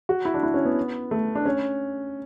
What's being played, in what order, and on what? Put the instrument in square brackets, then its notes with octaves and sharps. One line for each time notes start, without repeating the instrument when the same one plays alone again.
[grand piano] F#4
E4
D4
E4
C#4
B3
A3
D4
C#4